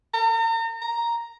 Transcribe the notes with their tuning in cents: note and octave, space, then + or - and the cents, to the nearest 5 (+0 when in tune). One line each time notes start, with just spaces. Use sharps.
A#5 -40
A#5 +5